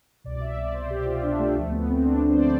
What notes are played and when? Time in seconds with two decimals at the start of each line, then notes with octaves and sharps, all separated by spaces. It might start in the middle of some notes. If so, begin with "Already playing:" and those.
0.24 C2 B2 D5
0.41 E5
0.57 D5
0.74 C5
0.90 G4
1.06 F4
1.23 D4
1.39 A3
1.56 D2 D3 F3 A3
1.72 B3
1.89 C4
2.05 D4
2.29 C5
2.37 D5